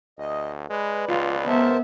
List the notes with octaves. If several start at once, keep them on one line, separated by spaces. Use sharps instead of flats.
D2 D#5
G#3 B4 D5
C#2 F4
B3 A#4 C5 E5 A5